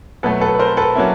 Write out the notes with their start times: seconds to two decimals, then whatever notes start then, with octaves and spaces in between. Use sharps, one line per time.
0.23 B2 F#3 A3 A4 B4
0.41 A4 B4
0.54 B4
0.59 A#4 C5
0.77 A4 B4
0.95 F#3 A#3 C#4 E4